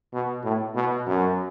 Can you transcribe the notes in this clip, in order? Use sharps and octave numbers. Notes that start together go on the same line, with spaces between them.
B2
A2
B2
F#2